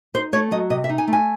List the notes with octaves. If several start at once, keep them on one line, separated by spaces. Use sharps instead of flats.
D#4 C5
A3 C#5
F#3 D#5
C3 D#5
E5
D#4
G#5
A3
G#5